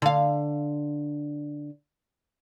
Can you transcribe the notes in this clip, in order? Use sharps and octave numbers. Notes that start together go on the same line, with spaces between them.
D3 F5